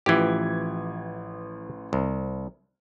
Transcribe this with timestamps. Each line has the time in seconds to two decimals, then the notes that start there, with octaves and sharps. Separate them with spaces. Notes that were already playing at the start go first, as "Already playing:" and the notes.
0.06 A1 E3 F3 G4 G#6
1.93 C2